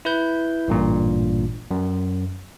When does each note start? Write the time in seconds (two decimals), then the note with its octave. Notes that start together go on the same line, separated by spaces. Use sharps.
0.05 E4 B4 G6
0.68 A1 G2 A#2
1.71 F#2